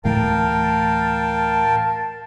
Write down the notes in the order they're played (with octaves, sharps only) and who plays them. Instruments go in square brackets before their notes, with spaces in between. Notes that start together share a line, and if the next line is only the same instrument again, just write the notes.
[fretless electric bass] D2 A2 E3 [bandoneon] A#4 F5 G5 [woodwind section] A5